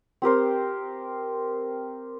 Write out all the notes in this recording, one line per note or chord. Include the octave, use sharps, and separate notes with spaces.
C4 G4 A#4 C5